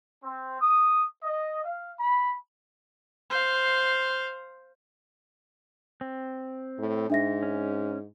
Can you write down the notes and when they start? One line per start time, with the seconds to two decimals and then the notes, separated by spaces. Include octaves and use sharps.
0.24 C4
0.60 D#6
1.23 D#5
1.64 F5
2.00 B5
3.30 C5 F5
6.01 C4
6.78 A2
7.10 G#2 D4 E5 A#6
7.43 C#4